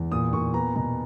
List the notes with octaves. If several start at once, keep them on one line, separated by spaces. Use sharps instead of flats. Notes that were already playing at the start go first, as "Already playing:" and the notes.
Already playing: E2
A#2 D#6
A#2 C#6
B3 A#5
B2 A#5